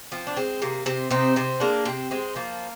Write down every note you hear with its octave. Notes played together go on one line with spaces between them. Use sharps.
F3 C4
D4
G#3 C4
C3 A#3
C3 C4
C3 C4 D#4
C3 C4
G#3 A#3 D4
C3 C4
G#3 C4
F3 A#3